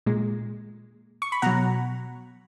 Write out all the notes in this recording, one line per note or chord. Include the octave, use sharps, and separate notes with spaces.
A#2 G#3
C#6
B5
B2 F#3 F#5 A#5